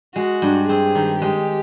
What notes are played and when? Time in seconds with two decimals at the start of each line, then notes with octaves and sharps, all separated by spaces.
0.15 G#3 F#4
0.42 G2
0.68 C4 G#4
0.95 D#3
1.21 G#3 G4